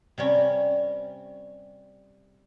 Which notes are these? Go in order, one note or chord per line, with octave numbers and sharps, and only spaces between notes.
C3 G3 C#4